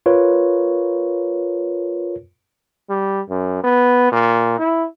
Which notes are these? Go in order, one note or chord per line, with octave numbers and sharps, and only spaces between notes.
F4 A#4 B4 C#5
G3
F#2
B3
A#2
E4